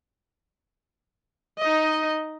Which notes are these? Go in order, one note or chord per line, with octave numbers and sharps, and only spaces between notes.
D#4 D#5